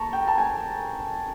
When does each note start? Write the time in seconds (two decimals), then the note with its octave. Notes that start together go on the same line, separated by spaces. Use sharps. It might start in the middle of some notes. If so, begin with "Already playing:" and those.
Already playing: A#3 A5 A#5 C#6
0.13 G5
0.28 A5
0.38 G#5